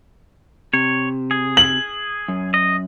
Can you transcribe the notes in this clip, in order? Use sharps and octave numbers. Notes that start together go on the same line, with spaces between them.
C3 C#5
G#4
F#7
F#2
D#5